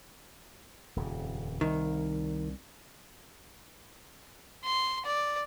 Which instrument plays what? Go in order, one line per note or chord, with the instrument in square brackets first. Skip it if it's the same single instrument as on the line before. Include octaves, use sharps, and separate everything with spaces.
[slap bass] D#1 F2 C#3
[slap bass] C2 [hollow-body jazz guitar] D#3
[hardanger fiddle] C6
D5